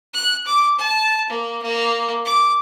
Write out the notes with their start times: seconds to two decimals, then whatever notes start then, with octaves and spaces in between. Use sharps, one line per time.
0.14 F#6
0.46 D6
0.78 A5
1.30 A#3
1.62 A#3
2.25 D6